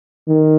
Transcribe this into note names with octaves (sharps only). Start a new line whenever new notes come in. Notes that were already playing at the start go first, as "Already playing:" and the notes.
D#3